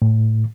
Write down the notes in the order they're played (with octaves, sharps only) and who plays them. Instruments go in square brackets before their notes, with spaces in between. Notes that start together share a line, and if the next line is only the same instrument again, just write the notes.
[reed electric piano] A2